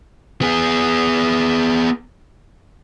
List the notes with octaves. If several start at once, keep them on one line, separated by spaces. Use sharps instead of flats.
B3 G#4